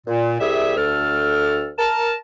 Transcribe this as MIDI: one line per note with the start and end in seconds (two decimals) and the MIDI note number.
0.07 0.36 46
0.40 0.75 36
0.40 0.75 55
0.40 0.75 67
0.40 0.75 68
0.40 0.75 76
0.76 1.71 38
0.76 1.71 69
0.76 1.71 89
1.78 2.14 70
1.78 2.14 81